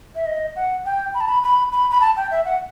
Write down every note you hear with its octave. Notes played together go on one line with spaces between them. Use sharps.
E5
D#5
F#5
G5
B5
A5
B5
B5
B5
B5
A5
G5
E5
F#5